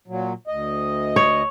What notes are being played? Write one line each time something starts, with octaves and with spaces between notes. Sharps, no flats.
A#2 F#3
D2 D#5
C#5